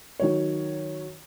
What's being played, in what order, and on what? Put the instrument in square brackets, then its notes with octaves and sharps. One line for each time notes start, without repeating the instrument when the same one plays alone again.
[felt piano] D#3 F#3 C#5